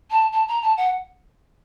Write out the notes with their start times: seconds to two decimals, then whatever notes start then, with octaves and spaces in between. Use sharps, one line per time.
0.10 A5
0.32 A5
0.48 A#5
0.62 A5
0.77 F#5